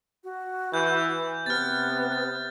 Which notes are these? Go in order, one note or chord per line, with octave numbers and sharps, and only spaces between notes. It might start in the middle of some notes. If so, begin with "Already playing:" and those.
F#4
E3 G6
C3 B3 F6 A6
A6